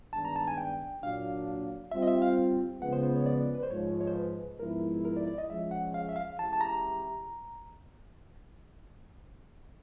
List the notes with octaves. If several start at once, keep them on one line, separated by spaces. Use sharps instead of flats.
G2 D#3 G#3 B3 D4 A5
A#5
A5
G#5
G5
A#2 F#3 A#3 D4 F5
G3 C4 F4 E5
D#5
E5
F5
C#3 F3 G#3 B3 F#5
C5
C5
C#5
D5
B4
C5
G#2 F3 G#3 C#5
C5
C#5
C5
B4
G#2 F3 G#3 B3 E4 A#4
A#4
D5
D5
D#5
F3 G#3 C#4 E5
F#5
F5
E5
F5
E3 G#3 C#4 E4 G4 A5
A5
A#5